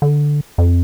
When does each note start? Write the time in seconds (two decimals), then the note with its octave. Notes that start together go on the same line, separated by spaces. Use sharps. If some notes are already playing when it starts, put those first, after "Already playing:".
0.02 D3
0.58 F2